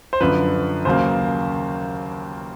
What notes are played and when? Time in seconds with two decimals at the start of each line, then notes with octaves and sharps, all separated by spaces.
0.13 C5
0.20 F#2 D3 F3 B4
0.85 D#2 C#3 F#3 A#3 C5